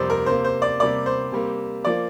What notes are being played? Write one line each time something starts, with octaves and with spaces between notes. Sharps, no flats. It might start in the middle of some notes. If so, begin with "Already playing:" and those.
Already playing: F2 C3 G3 A#3 C5 D5
A#4
C3 A#3 C5
C5
D5
C3 G3 A#3 D5
C5
C3 G3 A#3
F3 A#3 D5